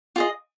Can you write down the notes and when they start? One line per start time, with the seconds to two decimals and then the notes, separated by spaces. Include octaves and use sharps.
0.16 F4 G#4 D#5